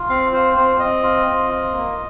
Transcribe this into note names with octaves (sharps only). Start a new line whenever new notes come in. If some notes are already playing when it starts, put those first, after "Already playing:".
Already playing: F4
C4 F5
F4 C5
C4 C5
C4 D#5
F4
C4
F4
A#3